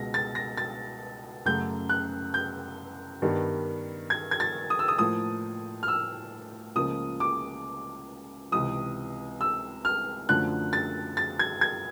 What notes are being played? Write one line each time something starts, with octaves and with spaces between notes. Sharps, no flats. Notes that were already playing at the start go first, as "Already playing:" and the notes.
Already playing: C#2 B2 G#3 A#6
A6
A#6
A6
F#2 C#3 F#3 A3 G6
F#6
G6
G2 D#3 G3 B3
G#6
G#6
A6
D#6
E6
D#6
A2 F3 A#3 D#6
F6
E6
C#2 C#3 F3 A#3 D#6
D6
C#2 C3 E3 D#6
E6
F6
F#2 D3 F3 A3 F#6
A6
A6
G#6
G#6